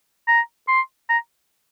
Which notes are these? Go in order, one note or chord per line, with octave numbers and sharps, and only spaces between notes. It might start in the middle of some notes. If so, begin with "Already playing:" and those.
A#5
C6
A#5